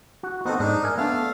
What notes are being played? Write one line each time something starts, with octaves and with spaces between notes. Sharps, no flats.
F#4
B3 C4 D#4 F#4 A4
G#2 D4 D#4
A#4 E5 G#5
A3 B3 D4 F5